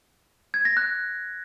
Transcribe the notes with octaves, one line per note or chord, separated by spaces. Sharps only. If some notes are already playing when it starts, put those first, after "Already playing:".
G#6
A#6
F#6